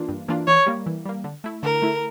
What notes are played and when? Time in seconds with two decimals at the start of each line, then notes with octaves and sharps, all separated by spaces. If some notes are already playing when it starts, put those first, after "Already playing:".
Already playing: E3 A#3 D4 F4
0.08 G2
0.28 E3 A#3 D4 F4
0.47 E3 C#5
0.66 G3 A#3
0.86 E3
1.05 G3 A#3
1.24 D3
1.44 A3 E4
1.63 D3 A#4
1.82 A3 E4